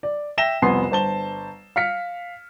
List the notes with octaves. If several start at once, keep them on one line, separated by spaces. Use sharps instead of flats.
D5
E5 G5 A#6 E7 G7
C2 F2 B3 G#5 C6 C7
G1 C5 A5 G7
F5 F6 B6 C#7